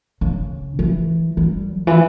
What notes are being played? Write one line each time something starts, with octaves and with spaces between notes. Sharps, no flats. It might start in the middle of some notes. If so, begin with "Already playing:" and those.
C#3
E3
G3
C#3
E3